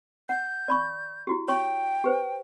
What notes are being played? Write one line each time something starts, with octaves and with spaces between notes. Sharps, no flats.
F#5 G6
D5 B5 C#6
E4 F#4 G4
C#5 G5 C#6
G4 B4 C5